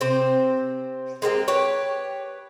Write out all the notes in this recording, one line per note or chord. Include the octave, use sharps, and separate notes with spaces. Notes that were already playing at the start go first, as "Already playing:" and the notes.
C3 C4 C5
G#3 A#3 C4 G4
G4 B4 C#5